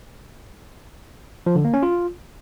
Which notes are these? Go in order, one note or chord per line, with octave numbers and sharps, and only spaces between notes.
F3
D3
A#3
C#4
F4